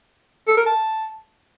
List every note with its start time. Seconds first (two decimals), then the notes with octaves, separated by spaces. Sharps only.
0.48 A4
0.57 A#4
0.66 A5